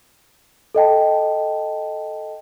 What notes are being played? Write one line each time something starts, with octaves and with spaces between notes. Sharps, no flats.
A4 D#5 G5 A5